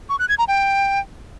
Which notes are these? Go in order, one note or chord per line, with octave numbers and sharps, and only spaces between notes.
C#6
F#6
G#6
A#5
G5